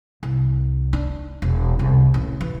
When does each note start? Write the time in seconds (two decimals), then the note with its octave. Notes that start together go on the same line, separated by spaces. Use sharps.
0.23 C2
0.93 D4
1.42 E1
1.79 C2
2.14 A1
2.41 E3